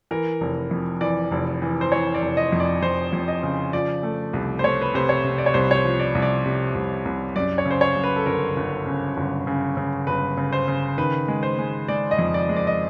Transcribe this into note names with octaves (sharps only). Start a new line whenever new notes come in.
E3 A#4
F1
F2
E3 D5
F1
E3
C5
E3 C#5
D5
F1
D#5
F2
D5
F2 C5
F2
D#5
C#3
F3 D5
A3
C2
C5
A3 C#5
B4
C3 C5
C#5
C3
D5
C#5
C2 C5
C#5
C5
F3
D5
C2
D5
C3
C2
C2
F#2 D5
C#5
C#3
C5
C#5
F#2
B4
A4
G1 A#4
G1
C#3
G1
C#3
C#3
G1 B4
C#3
C5
C#3
D#3 B4
G#3
C5
G#3
G#3 D5
D#5
F2
D5
G#3
D5
D#5